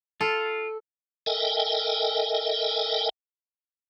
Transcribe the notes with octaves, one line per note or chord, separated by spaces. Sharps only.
F4 A4
A4 A#4 D#5 E5 G5 G#5